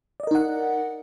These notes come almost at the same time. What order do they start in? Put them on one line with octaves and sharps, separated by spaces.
D5 D#5 A#4 D#4 F#5